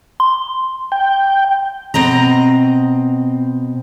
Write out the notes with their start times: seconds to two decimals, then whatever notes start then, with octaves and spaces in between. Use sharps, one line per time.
0.20 C6
0.92 G5
1.94 B2 C4 D#5 A#5